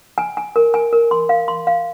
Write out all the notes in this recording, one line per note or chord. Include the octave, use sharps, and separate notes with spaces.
G#5
G#5
A#4
G#5
A#4
C6
F5
C6
F5